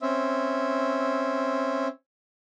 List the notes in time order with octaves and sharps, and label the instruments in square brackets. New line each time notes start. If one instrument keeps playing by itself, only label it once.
[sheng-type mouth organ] C4 C#4 E5